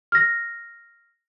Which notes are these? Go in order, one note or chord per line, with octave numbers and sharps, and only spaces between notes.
F6 A#6